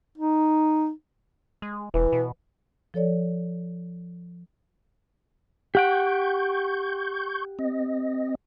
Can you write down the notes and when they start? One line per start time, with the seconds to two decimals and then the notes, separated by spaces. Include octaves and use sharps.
0.17 D#4
1.62 G#3
1.94 E1 E3
2.12 B2
2.94 F3 A4 C#5 D5
5.75 G4 F#5 G5 C#6 G6
7.59 C4 D#5